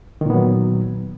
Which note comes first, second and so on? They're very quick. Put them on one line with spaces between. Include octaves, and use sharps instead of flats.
D#3 A#2 B3 F#3